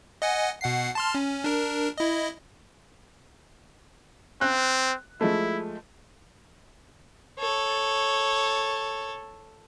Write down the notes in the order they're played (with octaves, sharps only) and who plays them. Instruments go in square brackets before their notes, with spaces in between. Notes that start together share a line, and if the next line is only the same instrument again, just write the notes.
[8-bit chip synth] D#5 F#5 G#5
B2 F#5 C7
A5 C6 F6
C#4
D4 A#4
E4 D#5
[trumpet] C4 [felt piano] F#6
[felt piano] F3 G#3 A3 [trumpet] E4
[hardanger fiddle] A4 C#5